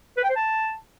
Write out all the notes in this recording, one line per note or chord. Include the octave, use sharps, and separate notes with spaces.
B4
G5
C5
A5